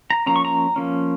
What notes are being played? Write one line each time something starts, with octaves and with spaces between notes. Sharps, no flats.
A#5
F3 A#3 C#4 A#5
C#6
A#5
F3 A#3 C#4